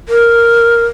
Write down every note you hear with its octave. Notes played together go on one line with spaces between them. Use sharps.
A#4